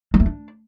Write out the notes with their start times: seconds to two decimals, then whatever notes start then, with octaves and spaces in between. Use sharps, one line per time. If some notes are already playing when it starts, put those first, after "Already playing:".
0.14 G#3
0.20 A3
0.26 D4